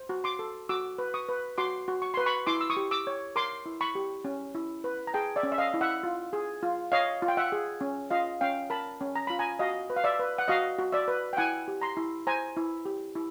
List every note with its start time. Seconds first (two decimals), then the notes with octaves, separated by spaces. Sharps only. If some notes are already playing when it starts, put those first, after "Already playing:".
Already playing: C5
0.09 F#4
0.24 C6 D6
0.39 A4
0.69 F#4 D6 E6
0.98 B4
1.14 C#6 D#6
1.29 B4
1.58 F#4 C6 D6
1.88 F#4
2.02 C#6
2.14 B4 C6
2.26 B5 C#6
2.47 E4 C6 D6
2.61 E6
2.70 C#6 D#6
2.77 G4
2.91 D6 E6
3.07 C#5
3.36 A#4 C6 D6
3.66 E4
3.81 B5 C#6
3.95 G4
4.25 C#4
4.55 E4
4.84 B4
5.07 A#5
5.14 G#4 G5 A5
5.36 D5 E5
5.43 C#4
5.52 E5
5.58 D#5 F5
5.74 E4
5.81 E5 F#5
6.03 F4
6.33 G#4
6.63 F4
6.92 C#5 D#5 F5
7.22 F4
7.28 G5
7.37 E5 F#5
7.52 G#4
7.81 C#4
8.10 F4 D#5 F5
8.41 C#4 F5 G5
8.70 A#4 A5 B5
9.01 C#4
9.16 A#5
9.27 F4 B5
9.39 G#5 A#5
9.59 F#4 D#5 F5
9.90 B4
9.96 F5
10.04 D5 E5
10.19 B4
10.38 F#5
10.48 F#4 D#5 F5
10.79 F#4
10.92 D5 E5
11.08 B4
11.33 G5
11.37 E4 F#5 G#5
11.68 G4
11.82 A#5 C6
11.97 E4
12.27 C5 G#5 A#5
12.57 E4
12.85 G4
13.15 E4